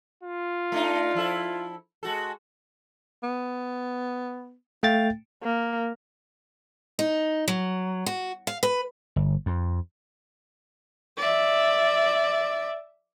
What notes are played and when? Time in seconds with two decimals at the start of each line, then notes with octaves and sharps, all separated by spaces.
0.24 F4
0.72 A3 D4 D#4
1.15 F3 E4 A4
2.03 G#3 F#4 A4
3.23 B3
4.83 A3 F5 G5 A6
5.43 A#3
6.99 D#4
7.48 F#3
8.06 F#4
8.47 F5
8.63 B4
9.16 G1
9.46 F2
11.17 D5 E5